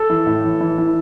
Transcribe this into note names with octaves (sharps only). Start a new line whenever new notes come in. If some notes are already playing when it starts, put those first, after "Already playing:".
Already playing: A4
E3
A2
E3
E3
E3